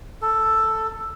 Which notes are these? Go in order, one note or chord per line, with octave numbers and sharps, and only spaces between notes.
A4